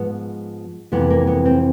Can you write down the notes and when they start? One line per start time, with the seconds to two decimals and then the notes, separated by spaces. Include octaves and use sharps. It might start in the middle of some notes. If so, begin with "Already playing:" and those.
Already playing: G#2 F3 G#3 B3
0.92 F2 C3 E3 B3
1.10 A#3
1.27 B3
1.46 C4